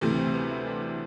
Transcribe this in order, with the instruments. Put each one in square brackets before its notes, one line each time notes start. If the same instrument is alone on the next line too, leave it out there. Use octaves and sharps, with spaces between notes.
[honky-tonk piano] D2 C3 E3 A3 [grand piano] G3
[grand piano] C4
B3
E4
C4
D4
D4